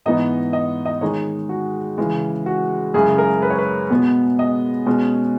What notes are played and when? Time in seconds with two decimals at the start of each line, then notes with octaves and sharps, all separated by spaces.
0.06 G#2 E3 B3 D#4 D#5
0.53 D#5
0.86 D#5
1.01 D#3 G#3 D#4 C#5
1.49 F#4
1.98 C#3 E3 G#3
2.46 F#4
2.94 F#2 C#3 G#3 C#4 E4 G#4
3.18 A#4
3.42 B4
3.50 C#5
3.59 B4
3.90 B2 G#3 B3
4.39 D#5
4.86 B2 G#3 C#4